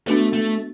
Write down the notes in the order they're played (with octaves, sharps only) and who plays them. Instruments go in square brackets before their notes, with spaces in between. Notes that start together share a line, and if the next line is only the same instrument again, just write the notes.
[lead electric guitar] A3 [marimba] B3 D4 F#4 B4
[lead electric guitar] A3